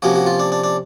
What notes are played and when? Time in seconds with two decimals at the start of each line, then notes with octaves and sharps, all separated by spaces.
0.02 C3 F3 A#3 C#4 F#4
0.15 F#4
0.26 F4
0.39 D4
0.52 D4
0.64 D4